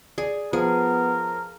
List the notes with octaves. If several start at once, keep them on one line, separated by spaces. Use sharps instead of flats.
G#4 D5
F3 B3 G#4 A#4